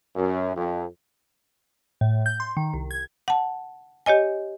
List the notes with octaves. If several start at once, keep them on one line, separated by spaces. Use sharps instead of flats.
F#2
F2
A2
G6
C6
D#3
C2
G#6
F#5 A5
G4 C#5 D#5 G#5